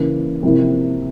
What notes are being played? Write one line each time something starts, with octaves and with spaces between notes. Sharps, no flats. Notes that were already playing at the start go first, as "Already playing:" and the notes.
Already playing: C#3 E3 A#3
C3 F3 A#3 E4